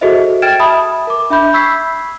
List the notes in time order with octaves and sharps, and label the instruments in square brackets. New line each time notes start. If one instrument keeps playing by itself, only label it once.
[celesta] F#4 G#4 A4 C5 D#5 E5
G5 F6 G#6 A6 D7 E7
E5 A5 B5 D#6
A#4 D6
D4 E5 B5 G6
B5 C#6 E6 G#6 B6 C7